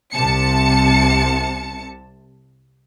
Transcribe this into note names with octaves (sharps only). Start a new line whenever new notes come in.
C2 C3 A5 C#7